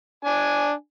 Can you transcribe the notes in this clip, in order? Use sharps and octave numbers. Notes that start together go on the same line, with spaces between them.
D4 G#5